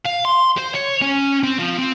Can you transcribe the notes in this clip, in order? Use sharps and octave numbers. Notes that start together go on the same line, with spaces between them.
F5
C6
C5
C#5
C#4
C4
F3
C4